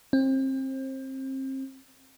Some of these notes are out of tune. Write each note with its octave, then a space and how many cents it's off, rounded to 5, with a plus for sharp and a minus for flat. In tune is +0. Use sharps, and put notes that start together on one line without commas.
C4 +30